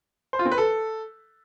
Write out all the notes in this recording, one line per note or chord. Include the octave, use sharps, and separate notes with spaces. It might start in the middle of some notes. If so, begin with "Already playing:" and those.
C5
F4
C4
B4
A4